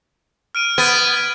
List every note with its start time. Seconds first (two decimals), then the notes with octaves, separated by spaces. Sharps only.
0.55 F6 D7 D#7
0.78 B3 G#6